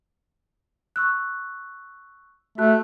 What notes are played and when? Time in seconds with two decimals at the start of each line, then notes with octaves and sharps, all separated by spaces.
0.96 C#6 E6 F#6
2.58 A3 F#4 A5 F#6